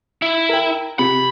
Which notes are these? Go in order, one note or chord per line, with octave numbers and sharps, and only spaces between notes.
E4
A#4 G5
C3 B5